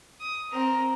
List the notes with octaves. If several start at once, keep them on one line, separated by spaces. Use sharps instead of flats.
D#6
C4 A#4